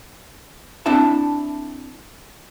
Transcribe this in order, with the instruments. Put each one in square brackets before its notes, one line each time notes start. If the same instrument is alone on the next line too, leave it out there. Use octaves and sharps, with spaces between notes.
[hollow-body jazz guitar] C4 D4 E4 E5 A5